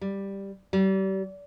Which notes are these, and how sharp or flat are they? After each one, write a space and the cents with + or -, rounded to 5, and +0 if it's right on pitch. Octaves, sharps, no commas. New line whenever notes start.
G3 +5
G3 -35